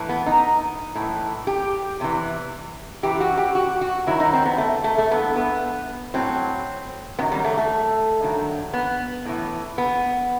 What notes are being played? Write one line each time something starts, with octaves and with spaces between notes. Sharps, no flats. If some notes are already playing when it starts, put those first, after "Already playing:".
Already playing: A2 E3
B3
D#4
A2 E3
G4
E2 C3 E3
F#2 E3 G4
F#4
G4
F#4
F#4
G2 D#3 F#3 E4
D#4
C4
B3
A3
A3
A3
G2 E3 B3
B3
A2 F#3 C4
F#2 D#3 F#3 B3
G3
A3
A3
G2 D#3 F#3
B3
A2 E3
B3